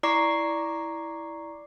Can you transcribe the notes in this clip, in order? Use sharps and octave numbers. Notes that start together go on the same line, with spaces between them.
E4 D5 A#5 C#6 D6 C7